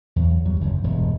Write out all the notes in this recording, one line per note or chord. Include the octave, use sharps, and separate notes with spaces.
E2 F#3
E2 F#3 G3
F#1 D2
E1 G2